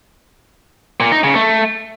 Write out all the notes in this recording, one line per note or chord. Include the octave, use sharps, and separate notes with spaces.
A#2
D#4
C#3
A3